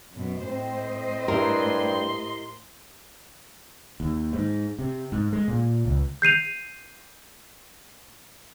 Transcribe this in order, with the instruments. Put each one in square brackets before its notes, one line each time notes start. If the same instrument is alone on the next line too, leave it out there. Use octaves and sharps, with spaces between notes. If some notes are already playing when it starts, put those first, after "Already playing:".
[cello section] F#2 B2
[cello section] A2 C5 D#5 [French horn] C4
[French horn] G2 [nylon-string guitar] E4 G4 A#4 [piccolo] C6
[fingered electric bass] D#2
G#2
C3
G#2
G#3
A#2
C#2
[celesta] G6 C7 D#7 F7